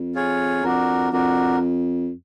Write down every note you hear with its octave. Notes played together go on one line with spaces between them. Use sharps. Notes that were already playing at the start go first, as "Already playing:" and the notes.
Already playing: F2
F4 G#4 C#5
F2 D4 F#4 A#4
F2 D4 F#4 A#4